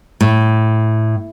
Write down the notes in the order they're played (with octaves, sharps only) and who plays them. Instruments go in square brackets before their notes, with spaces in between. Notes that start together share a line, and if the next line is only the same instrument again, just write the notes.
[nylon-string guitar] A2